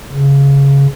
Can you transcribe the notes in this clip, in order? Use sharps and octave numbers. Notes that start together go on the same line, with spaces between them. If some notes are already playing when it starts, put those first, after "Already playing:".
C#3